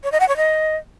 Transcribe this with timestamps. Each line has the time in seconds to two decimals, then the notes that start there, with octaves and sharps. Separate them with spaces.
0.04 C#5
0.12 D#5
0.20 F#5
0.28 C#5
0.37 D#5